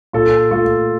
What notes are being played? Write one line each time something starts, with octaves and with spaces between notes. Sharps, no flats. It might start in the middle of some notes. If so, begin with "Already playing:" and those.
A#2 F4 A4
A3 F4 A4